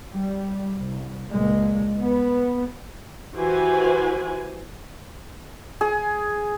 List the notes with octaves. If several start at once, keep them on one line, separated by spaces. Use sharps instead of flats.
G3
C2
C#2 A#2 G#3
B3
E3 F#4 G4 B4 C5 G#5
G#4